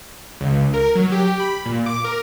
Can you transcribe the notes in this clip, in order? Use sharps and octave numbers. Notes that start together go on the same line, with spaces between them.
C#2
A#4
F#3
G4
B5
A#2
D6
A#4